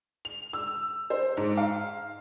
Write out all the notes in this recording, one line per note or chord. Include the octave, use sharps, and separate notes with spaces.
F7
E6
C5
G#2
F5